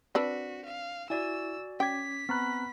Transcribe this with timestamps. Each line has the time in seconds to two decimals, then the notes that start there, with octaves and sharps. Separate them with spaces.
0.15 C4 D4 F#4 B4 B6
0.65 F5
1.10 E4 F#4 D5 G#5 E6
1.80 C#4 G5 D6 G#6 B6
2.29 B3 C4 A#5 B5 F#6